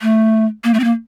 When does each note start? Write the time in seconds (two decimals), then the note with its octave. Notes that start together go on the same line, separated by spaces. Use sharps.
0.02 A3
0.64 A#3
0.74 A3
0.80 C4
0.84 A#3